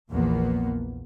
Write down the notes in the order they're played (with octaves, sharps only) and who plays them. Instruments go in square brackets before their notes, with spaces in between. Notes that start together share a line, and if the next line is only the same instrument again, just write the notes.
[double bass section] A#1 E2 F3 A#3 B3